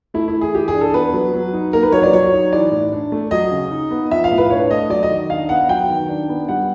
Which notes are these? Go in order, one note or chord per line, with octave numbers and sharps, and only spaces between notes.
A3 E4
E4
E3
G#4
E3 G4
G#4
D4
A4
B3 B4
F#3
F#3
D#4
A#3 A#4
B4
F#3 C#5
D5
F#3 C#5
D#4
E3 D5
A2
D4
A3
F#3 D#5
C#3
D#4
B3
F3 E5
F5
A2
B4
D4 C#5
A3 D#5
F#3 D5
D#5
D#3
D4 F5
B3 F#5
F#3 G5
D#3
D4
B3
G3 F#5